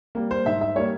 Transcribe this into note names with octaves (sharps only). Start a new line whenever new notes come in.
G3 A#3
C5
G#2 E5
E5
G3 A#3 C#5